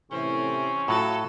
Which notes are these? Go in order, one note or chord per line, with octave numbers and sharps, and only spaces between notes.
A2 C3 E3 C4 C#4
A2 F#3 F4 F#4 A4